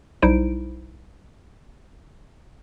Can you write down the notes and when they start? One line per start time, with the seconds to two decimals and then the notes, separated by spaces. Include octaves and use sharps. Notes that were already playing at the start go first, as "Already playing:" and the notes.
0.22 B1 G3 D#4 E4 C5 D7